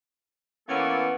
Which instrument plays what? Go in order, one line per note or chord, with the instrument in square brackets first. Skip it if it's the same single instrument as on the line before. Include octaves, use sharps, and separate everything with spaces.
[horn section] E3 B3 C#4 [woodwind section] A#3 A4